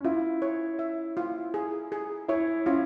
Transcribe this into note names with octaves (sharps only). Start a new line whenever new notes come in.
C#4
E4 F4
C#5
E5
F4
G#4
G#4
E4 C#5
C#4 F4